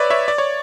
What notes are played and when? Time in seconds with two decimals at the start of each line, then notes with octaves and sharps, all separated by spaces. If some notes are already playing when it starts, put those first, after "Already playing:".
Already playing: B4 C#5 D5 E5
0.10 C#5 E5
0.28 D5
0.38 C#5